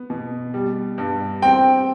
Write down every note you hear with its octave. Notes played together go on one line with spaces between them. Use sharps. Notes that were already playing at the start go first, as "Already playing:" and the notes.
Already playing: B3
B2
G3
G2
C4 G5